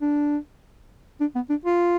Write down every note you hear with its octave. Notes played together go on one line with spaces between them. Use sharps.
D4
D4
B3
D4
F4